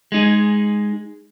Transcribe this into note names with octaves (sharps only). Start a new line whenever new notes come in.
G#3 D#4 G#4